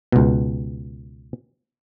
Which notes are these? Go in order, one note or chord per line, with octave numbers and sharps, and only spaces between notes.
C#2 B2